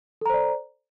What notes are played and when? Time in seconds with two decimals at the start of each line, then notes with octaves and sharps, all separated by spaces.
0.21 A4
0.26 A#5
0.30 C5
0.34 D5